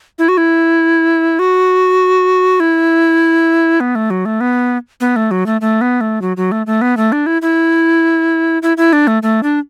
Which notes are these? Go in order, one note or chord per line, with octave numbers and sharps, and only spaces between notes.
E4
F#4
E4
F#4
E4
B3
A3
F#3
A3
B3
B3
A3
F#3
A3
A3
B3
A3
F#3
F#3
A3
A3
B3
A3
D4
E4
E4
E4
E4
D4
A3
A3
D4